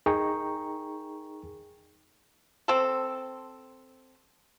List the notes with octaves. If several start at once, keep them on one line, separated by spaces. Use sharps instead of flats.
D#4 G#4 A#4 G5 A#5 C#6
C4 A4